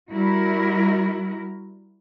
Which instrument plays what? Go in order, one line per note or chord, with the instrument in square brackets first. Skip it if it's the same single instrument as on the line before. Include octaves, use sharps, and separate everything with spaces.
[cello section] G3 E4 F#4 A#4